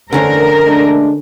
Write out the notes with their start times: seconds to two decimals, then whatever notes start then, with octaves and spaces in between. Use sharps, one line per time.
0.13 E2 D3 A3 C#4 D4 A#4 C5
0.65 G#3 A3 D4